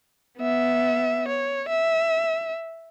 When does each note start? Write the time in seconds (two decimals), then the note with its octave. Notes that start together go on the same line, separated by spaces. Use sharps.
0.38 B3 E5
1.28 C#5
1.69 E5